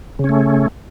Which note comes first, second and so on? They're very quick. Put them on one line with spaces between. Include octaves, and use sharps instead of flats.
C#3 C#4 A3